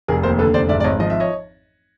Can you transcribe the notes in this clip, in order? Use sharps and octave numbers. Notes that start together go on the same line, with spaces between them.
F1 G#4 A#4
D#2 A#4 C5
D3 A4 B4
F1 C5 D5
G#1 D5 E5
D5
G#1 C#5 D#5
F3 D#5
E5
C#5 D#5